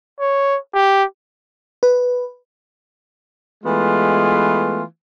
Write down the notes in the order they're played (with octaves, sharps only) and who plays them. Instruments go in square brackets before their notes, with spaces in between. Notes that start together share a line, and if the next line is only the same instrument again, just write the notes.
[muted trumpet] C#5
G4
[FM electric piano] B4
[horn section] E3 G#3 A3 B3 F4